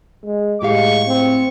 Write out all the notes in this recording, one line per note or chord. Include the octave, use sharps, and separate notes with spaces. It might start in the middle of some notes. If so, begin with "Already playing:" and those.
G#3
A2 G#3 G4 F5 C#6
C4